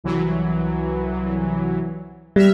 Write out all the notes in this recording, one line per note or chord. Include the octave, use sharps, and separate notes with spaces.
C2 E3 F#3
G3 E5 F6